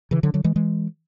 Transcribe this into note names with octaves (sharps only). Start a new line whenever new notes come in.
C#3 E3
D3 F#3
D3 F#3
E3 G#3
E3 G#3